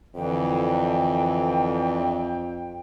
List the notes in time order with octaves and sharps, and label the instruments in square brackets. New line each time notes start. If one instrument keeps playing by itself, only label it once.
[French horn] F2 [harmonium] D3 E3 [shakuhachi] G5